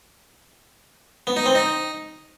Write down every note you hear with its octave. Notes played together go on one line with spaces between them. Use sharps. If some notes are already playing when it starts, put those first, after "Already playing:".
B3
D#4
C4
D#4